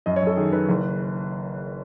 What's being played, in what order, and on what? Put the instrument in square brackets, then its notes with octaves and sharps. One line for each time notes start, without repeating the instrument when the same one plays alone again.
[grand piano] F#2 D#5
C#5
F#2 A4
D#3 G#4
D#3 B4
F#1